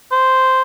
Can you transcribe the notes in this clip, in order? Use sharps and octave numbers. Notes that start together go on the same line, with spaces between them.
C5